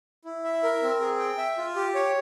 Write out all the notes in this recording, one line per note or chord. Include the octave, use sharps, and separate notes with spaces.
E4
E5
A#4
C4
G#4
G5
E5
F4
G4
C#5